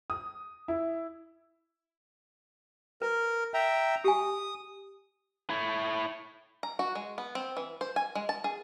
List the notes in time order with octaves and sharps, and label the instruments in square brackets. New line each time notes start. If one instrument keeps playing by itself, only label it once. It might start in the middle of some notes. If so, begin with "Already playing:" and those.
[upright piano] D#6
E4
[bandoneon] A#4 [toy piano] B4
[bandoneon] E5 G5 A#5
[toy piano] G4 G#5 [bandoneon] D#6
[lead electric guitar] E4 C#5
[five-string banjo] A#5
F#4
G#3
B3
C4
E3
C5
G#5
G#3
A5
G#4